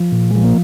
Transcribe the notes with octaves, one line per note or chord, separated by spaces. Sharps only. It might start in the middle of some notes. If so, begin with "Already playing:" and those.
Already playing: F3
A#2
F3 G#3
A#3